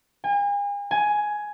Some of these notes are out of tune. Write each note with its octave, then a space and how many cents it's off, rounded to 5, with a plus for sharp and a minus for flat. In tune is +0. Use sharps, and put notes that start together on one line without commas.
G#5 -40
G#5 +10